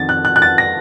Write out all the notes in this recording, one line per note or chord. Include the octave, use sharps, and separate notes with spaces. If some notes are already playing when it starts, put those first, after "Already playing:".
Already playing: F2 D#3 A6
F#6
F#6
F#6
A6
A#6